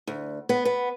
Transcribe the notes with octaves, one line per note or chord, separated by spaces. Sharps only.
D2
B3
B3